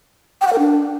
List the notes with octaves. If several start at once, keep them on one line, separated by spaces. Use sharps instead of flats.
G5
F#5
A#4
D4